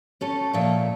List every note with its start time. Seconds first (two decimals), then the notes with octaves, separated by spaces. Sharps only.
0.21 A3 C#4 A4
0.53 A#2 F3 A3